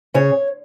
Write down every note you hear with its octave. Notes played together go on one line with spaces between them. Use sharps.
C#3 C#5